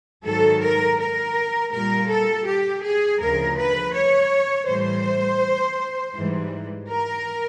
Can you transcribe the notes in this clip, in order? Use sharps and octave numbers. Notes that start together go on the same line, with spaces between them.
G#2 D#3 F#3 A4
A#4
A#4
A#2 G3 A#4
A4
G4
G#4
D2 C#3 F3 A#4
B4
C#5
A2 E3 G3 C5
G#2 E3 G3
A#4